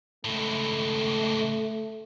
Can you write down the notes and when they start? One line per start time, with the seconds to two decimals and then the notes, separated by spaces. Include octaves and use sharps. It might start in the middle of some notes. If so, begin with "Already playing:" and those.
0.25 C#2 A2 A3